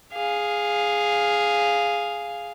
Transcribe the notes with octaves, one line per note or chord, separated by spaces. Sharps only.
G#4 F5